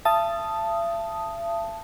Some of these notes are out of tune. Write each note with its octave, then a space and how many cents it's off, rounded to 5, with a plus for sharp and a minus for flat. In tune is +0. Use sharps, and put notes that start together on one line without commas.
E5 +45 A5 +0 D#6 +0